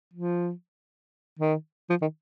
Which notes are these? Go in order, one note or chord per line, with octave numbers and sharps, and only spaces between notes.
F3
D#3
F3
D#3